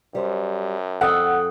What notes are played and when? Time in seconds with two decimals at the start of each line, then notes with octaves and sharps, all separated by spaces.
0.15 F#2 G3 C5
1.01 F2 A4 F#5 G5 D#6 F#6